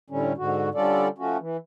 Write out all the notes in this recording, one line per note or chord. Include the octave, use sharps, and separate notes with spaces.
A2 D3 G3 C#4
G#2 D3 F#4
D3 G3 C#4 F4 A4 D5
F3 A3 C#4 F#4
E3